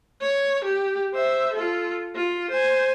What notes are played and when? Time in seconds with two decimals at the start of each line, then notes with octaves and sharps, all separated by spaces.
0.21 C#5
0.64 G4
1.14 C5 E5
1.54 F4 A4
2.16 F4
2.51 C5 G#5